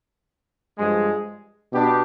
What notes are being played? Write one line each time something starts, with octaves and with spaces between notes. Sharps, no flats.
G2 F3 G#3
B2 B3 D4 G4